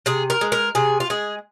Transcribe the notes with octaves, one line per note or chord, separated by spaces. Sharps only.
C3 G#4
A#4
G#3
A#4
C3 G#4
F4
G#3 G#4